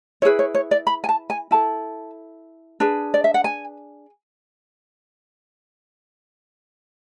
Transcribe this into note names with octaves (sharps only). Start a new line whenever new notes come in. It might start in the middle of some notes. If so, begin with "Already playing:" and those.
E4 G#4 B4 C#5
C#5
C#5
D5
B5
G#5
A5
G#5
E4 A4 A5
D4 G#4 B4
D5
E5
F#5
G#5